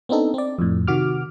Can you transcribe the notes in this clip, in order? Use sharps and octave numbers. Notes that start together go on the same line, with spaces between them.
B3 C4 D4 D#4 A4
C4 D5
F2 A2
C3 D#3 F#4 D6 F6